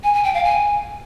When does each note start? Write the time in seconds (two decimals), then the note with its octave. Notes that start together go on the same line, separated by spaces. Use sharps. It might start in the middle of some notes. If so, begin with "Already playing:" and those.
0.04 G#5
0.14 G#5
0.24 G5
0.34 F5
0.44 G#5